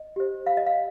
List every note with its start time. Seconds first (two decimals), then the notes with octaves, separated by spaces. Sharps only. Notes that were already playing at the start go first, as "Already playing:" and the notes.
Already playing: D#5
0.16 G4 C5
0.46 F5
0.57 D#5
0.67 F5